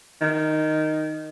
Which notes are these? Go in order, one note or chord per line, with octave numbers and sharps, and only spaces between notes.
D#3